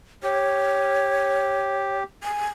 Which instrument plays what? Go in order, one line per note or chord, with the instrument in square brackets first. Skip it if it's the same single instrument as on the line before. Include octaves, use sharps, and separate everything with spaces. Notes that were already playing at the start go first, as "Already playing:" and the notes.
[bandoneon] G4 [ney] C#5
[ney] G#5